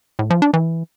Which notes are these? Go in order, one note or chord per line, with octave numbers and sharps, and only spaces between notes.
A2
F3
D4
E3